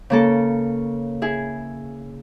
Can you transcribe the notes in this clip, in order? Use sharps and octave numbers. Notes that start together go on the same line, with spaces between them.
C#3 A#3 A4
E4 G#4